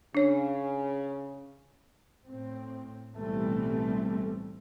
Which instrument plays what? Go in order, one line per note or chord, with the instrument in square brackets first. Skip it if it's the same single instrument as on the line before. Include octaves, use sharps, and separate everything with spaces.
[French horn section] C#3 [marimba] D4 C#5
[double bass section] A2 C4
B1 A2 E3 G3 A3 C4